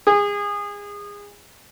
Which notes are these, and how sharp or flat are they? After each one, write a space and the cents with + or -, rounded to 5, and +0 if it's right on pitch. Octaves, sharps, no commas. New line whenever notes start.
G#4 -25